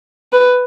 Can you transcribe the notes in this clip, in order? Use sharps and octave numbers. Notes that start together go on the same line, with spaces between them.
B4